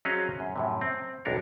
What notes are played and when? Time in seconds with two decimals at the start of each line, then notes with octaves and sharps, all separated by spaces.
0.05 F#3 C4 C#4 G#4 D#5 F5
0.40 F#2
0.56 F#2 A2 C3
0.81 C4
1.25 B1 F2 D4 A#4 C#5